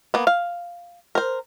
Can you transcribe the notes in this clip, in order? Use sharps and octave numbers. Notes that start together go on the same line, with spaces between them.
A#3 B3
F5
A#4 C5